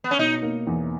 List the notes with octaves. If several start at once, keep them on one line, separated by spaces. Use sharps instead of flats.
B3
C#4
B2 D#4
A#3
E2